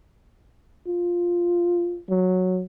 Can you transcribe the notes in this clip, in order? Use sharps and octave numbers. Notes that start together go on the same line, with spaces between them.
F4
F#3